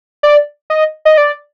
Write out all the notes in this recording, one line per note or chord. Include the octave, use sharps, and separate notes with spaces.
D5
D#5
D#5
D5